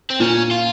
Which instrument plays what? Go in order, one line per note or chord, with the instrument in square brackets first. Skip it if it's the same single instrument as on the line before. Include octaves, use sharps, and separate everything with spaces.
[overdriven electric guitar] C4
[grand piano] A#2 [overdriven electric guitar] C#4
[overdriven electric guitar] F4